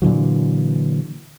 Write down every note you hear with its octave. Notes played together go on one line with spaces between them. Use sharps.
A#2 D3 E3 F#3